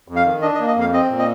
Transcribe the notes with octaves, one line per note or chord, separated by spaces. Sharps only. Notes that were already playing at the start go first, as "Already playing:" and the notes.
F2
F5
D#3
D4 D#5
D#5
A#3
D#5
F2 F5
C4 D#5
A#2
D#5